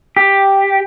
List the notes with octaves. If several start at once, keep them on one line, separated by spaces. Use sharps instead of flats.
G4